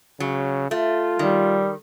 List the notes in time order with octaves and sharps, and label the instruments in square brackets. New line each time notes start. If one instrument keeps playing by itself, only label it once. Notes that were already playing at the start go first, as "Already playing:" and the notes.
[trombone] C#3 [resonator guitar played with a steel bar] F#3
[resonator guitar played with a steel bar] A3 [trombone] F4
[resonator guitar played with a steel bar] D#3 [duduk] G3